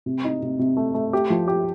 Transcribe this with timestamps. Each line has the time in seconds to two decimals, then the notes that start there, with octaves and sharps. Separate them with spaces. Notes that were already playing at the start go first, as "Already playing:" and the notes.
0.06 C3
0.24 D#4
0.42 C3
0.59 C3
0.77 A3
0.94 A3
1.13 G4
1.30 F3
1.48 G4